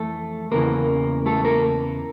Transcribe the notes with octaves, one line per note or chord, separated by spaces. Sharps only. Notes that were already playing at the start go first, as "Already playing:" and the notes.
Already playing: F2 E3 A3 A4
E2 C#3 E3 A#3 A#4
A3 A4
A#3 A#4